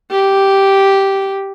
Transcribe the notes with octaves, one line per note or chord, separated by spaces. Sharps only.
G4